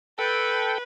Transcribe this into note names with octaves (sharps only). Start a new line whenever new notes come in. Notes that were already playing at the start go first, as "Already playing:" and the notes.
A4 B4 G5